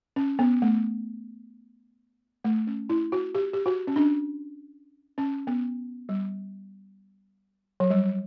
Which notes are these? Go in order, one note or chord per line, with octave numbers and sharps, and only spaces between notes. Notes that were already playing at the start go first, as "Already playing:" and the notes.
C#4
B3
A3
A3
C#4
E4
F#4
G4
G4
F#4
C#4
D4
C#4
B3
G3
F#3
G3